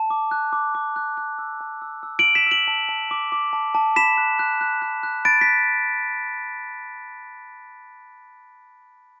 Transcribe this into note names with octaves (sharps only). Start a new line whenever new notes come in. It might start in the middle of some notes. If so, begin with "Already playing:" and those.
Already playing: A5
D6
F#6
D6
D6
F#6
F#6
E6
A5
E6
E6
D7 F#7
E6
B6 E7
E6 D7 F#7
A5
A5
D6
D6
A5
A5
B5 B6 E7
F#6
F#6
F#6
F#6
F#6
B5 A6 D7
B6
F#6